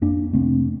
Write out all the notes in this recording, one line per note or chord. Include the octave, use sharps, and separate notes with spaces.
F2 A#3 D4
C3 A3 C4